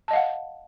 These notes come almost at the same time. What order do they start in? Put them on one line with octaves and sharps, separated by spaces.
A5 D#5 F5 F#5